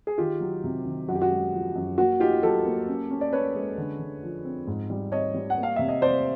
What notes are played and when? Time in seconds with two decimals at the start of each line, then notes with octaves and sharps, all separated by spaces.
0.07 G#4
0.18 D#3 F4 G4
0.40 F#3
0.64 C3
0.86 D#3
1.08 F#2 F#4
1.15 G4
1.22 F#4
1.30 G#3
1.53 F3
1.75 F#2
1.98 A#3 F#4
2.20 D#4 F4 G4
2.43 F#3 G4 A4
2.65 A#3
2.88 C#4
3.11 C#4
3.21 D5
3.33 C#4 B4 C#5
3.55 G#3
3.78 D3
3.99 D3
4.23 F3
4.45 C4
4.67 G#2
4.90 G3
5.12 C4 C#5 D#5
5.34 G3
5.50 F#5
5.58 A#3
5.63 F5
5.76 C3 E5
5.88 D#5
6.02 C3 C5 D5